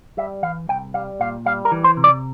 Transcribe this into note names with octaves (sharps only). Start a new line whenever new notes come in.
G3 E5
E3 F5
C2 G5
G3 F5
A#2 F5
G3 F5
A#4
E3
C5
C3
D5